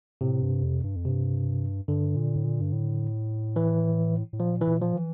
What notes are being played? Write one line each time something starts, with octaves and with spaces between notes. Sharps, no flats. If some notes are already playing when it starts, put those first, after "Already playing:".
A2 C3
G2
F2
G2
F2
G2 C3
G2 D3
A#2
A2
A#2
G2
A2
E3
A2
A#2 F3
E3
A#2
F3
E3